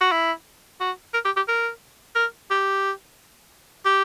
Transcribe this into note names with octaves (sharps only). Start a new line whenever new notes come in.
F#4
E4
F#4
A#4
G4
G4
A#4
A#4
G4
G4